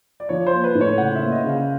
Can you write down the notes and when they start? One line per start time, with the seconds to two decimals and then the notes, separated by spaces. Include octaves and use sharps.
0.20 D5
0.29 F3 C#5
0.47 C5
0.53 A#3
0.64 B4
0.75 A2
0.81 C#5
0.98 C#3 F#5
1.16 E5
1.21 A#3
1.32 D#5
1.44 C#3
1.49 F5